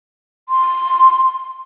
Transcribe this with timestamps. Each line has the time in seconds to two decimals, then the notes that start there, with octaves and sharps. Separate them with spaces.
0.49 C6